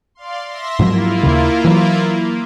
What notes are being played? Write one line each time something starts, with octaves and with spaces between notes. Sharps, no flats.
D5 F5 C6
E5 C6 A#6
G#2 F3 F#3 A#3 E4 F4
D#2 C#3
E3 F#3
A#3